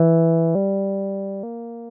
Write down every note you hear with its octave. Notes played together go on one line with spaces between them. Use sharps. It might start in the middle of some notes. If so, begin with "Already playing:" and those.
Already playing: E3
G3
A#3